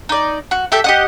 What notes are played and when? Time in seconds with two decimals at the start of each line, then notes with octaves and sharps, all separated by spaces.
0.09 D#4 D5
0.51 F#4
0.72 G4 A4 E5
0.84 G4 D#5 F#5